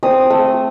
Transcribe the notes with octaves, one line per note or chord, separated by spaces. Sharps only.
C4 D#6
A3